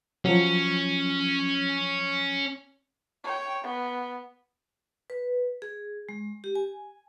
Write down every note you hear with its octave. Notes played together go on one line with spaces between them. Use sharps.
F3 F#3 C#4
C#5 G5
B3
B4
G#4
G#3
G4
G#5